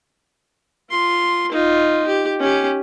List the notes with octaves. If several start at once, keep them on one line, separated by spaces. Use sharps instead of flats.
F4 C6
D#4 F4
G4
C#4 G4